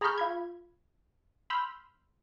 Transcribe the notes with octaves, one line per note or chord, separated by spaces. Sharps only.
G#4 A#5 B5 C#6 F6 G6
F4 B5 G#6
B5 C6 E6 F6 G6